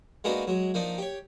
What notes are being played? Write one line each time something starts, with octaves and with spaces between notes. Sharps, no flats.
G#3 A#3 B3 D4 D#4 F#4
F#3 G#3
F3 A#3 D4 D#4
G4 C#5